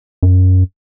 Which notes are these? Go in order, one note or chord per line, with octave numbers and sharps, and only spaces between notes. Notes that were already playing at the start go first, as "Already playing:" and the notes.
F#2